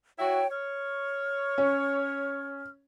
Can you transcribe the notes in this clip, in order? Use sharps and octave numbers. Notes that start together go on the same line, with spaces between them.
E4 F#4 C#5 G5
C#5 F6
C#4